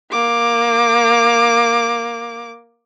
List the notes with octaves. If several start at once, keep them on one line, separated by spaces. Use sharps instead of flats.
A#3 D6